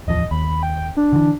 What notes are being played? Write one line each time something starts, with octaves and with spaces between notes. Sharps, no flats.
D1 E2 F3 D#5
D#2 B5
G5
D4
D3 E3